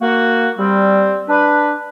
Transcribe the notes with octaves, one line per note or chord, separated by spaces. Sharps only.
A#3 F#4
G3 C4
D4 B4